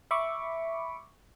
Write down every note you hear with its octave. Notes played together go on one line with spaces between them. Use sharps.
E5 B5 C#6 D6